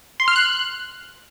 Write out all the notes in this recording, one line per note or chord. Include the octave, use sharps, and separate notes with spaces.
C6
F6
F#6